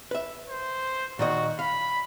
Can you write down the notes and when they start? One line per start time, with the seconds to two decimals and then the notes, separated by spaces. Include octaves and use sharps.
0.11 B4 E5
0.49 C5
1.19 A#2 D#3 F#4 D#5
1.59 F5 B5